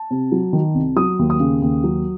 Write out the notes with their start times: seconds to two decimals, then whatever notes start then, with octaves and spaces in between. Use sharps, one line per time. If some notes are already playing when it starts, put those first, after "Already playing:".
Already playing: A5
0.11 C3
0.32 F#3
0.53 D#3
0.75 C2
0.96 F#3 D#6
1.19 D#2
1.30 D#6
1.40 C#3
1.62 D#2
1.84 F#3